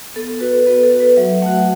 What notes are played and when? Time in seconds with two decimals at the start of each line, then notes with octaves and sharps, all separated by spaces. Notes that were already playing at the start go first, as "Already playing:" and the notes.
0.16 B3 A4
0.40 F#4 B4
0.67 B3 B4
0.83 A4
0.91 F#4
1.00 B4
1.17 F#3 E5
1.42 A3 F#4 F#5